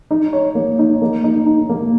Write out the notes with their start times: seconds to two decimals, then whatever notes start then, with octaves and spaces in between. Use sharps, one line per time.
0.11 D#4
0.33 C#5
0.55 A#3
0.79 D#4
1.02 A#3
1.24 D#4
1.46 D#4
1.69 A#3